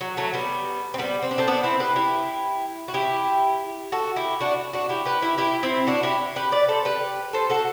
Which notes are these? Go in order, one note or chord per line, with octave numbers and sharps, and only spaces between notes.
F#3
F#3 A3
G3 B3
C4
G3 B3
C4
D4
A3 C4
B3 D4
C4 E4
G4 B4
E4 G4
F#4
E4 G4
F#4 A4
E4 G4
D4 F#4
D4 F#4
E4 G4
G4 B4
E4 G4
E4 G4
C4 E4
D4 F#4
E4 G4
G4 B4
B4 D5
A4 C5
G4 B4
A4 C5
F#4 A4